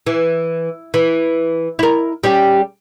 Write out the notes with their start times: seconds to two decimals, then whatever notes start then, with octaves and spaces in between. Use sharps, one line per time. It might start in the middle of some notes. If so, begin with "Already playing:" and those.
0.07 E3
0.94 E3
1.79 E4 A#4
2.24 G3 C#4 G4